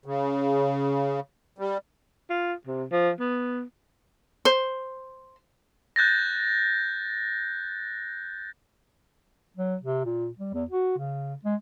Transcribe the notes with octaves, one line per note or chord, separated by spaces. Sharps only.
C#3
G3
F4
C3
F3
B3
C5
F#6 G6 A6 A#6
F#3
C3
A#2
G3
E2
F#4
C#3
G#3